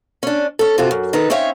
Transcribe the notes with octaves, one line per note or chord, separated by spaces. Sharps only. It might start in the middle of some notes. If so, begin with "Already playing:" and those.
C#4 D4
C#4 A4
C3 C4 F4 F#4 A4
F#2
D#3 D#4 A4 B4
C4 C#4 D#4 C#5 E5 F5